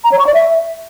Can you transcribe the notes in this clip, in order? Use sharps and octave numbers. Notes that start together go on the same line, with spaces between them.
A#5
C#5
C#6
D5
E5